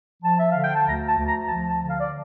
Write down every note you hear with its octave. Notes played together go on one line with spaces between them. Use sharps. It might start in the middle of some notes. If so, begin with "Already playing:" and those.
F3 A5
E5
D3 F5
G5
A5
D2 A#5
A5
D2
A#5
F3 A5
A5
D3
F5
D5